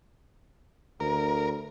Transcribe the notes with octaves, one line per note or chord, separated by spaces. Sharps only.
D2 A#4